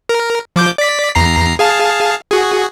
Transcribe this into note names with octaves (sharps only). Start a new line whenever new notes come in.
A#4
F3 D6 G6
D5 B6
E2 A#5 C7
G#4 F5 A5
F#4 G#4